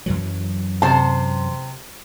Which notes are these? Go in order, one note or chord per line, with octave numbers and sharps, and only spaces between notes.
F#2 E3 F#3
C3 C5 A5